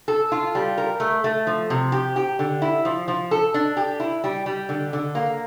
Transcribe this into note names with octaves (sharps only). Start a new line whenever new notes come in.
A4
F4
G3
A#4
A3
A3
F3
C3
G4
G4
D3
E4
F3
F3
A4
D4
G4
E4
G3
G3
D3
D3
A#3